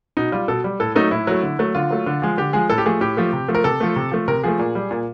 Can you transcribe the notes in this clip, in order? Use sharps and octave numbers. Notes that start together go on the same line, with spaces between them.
B2 D#4
G3 F4
B2 A4
G3
A2 A4
F#3 A3 D#4
A2 E4
F#3 A3
D3
F#3 A3
D3 F4
F#3 A3
D3
F3 G#3
D3 G4
F3 G#3 G#4
A2 A4
G4
F3 A3 G#4
A2 G4
F3 A3
C3
F3 A3
A#4
C3 A4
F3 A3
C3
F3 A3
C3 A#4
F3 A3 G#4
A#2
G3
A#2